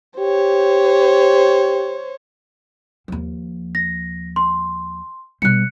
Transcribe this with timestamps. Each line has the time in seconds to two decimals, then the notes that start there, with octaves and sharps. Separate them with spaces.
0.19 G4 C5 C#5
3.08 D#2 F3
3.75 A#6
4.36 C6
5.42 B2 G3 F#6 C#7